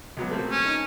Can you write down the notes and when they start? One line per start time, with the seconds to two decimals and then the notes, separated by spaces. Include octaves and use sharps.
0.17 C#2 F#3 B3
0.30 A3 A#3 C4
0.51 C#4
0.65 D#4